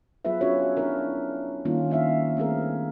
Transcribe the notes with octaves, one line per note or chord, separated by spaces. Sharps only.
F#3 B3 F4 G#4 B4 E5
C#4 D4 F4 F#4 B4 C#5
B3 D4 E4 A#4
D#3 G3 A#3 C#4 D#4 F4
D4 F4 E5 F5
A3 C4 G#4 A#4